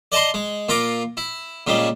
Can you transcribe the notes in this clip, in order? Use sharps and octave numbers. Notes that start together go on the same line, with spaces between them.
D5 D#5 A5 A#5 C6
G#3
A#2 F4 A#5 D6
E4
A#2 C#3 G3 G#3